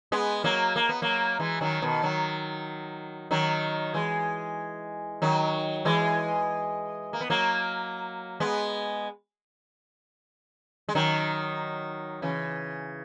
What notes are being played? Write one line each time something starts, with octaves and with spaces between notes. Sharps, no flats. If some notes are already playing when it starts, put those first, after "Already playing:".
G#3 B3
F#3 A#3
A#3
B3
F#3 A#3
E3 G#3
D#3 F#3
B2 D#3
D#3 F#3
D#3 F#3
E3 G#3
D#3 F#3
E3 G#3
A#3
B3
F#3 A#3
G#3 B3
G#3
D#3 F#3
C#3 E3